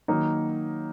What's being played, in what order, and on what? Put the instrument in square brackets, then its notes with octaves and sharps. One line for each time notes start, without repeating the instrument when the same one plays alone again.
[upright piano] D#3 F#3 A#3 D#4